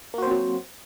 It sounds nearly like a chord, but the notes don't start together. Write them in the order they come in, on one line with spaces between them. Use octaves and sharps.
A#3 F#4 C5 C4 F#3